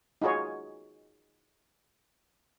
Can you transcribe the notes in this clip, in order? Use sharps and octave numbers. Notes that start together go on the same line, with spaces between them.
D#4 F4 F#4 G#4 C#5